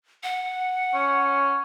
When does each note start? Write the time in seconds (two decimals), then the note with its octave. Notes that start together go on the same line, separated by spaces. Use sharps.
0.23 F#5
0.94 C#4